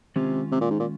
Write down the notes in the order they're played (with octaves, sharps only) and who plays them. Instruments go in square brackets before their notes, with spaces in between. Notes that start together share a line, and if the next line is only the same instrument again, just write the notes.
[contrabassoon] C3 [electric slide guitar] D#3 G#3 C#4 F4
[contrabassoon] C3
A#2
G#2
A#2